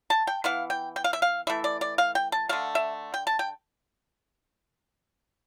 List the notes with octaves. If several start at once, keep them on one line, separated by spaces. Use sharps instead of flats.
A5
G5
E3 B3 F5
G5
G5
F5
E5
F5
E3 A3 E5
D5
D5
F5
G5
A5
D3 A3 F5
E5
G5
A5
G5